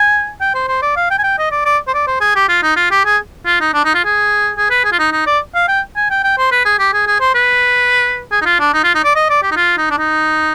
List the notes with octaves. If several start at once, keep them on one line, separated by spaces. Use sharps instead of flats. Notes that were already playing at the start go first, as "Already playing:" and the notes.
Already playing: G#5
G5
C5
C5
D5
F5
G5
G#5
G5
D#5
D5
D5
C5
D5
C5
G#4
G4
F4
D#4
F4
G4
G#4
F4
D#4
D4
D#4
F4
G#4
G#4
B4
G#4
F4
D#4
D#4
D5
F5
G5
G#5
G5
G5
C5
B4
G#4
G4
G#4
G#4
C5
B4
G#4
D#4
F4
D4
D#4
F4
D#4
D5
D#5
D5
G4
D#4
F4
D#4
D4
D#4